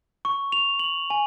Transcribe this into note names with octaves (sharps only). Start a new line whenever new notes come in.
C#6
F7
F#7
G#5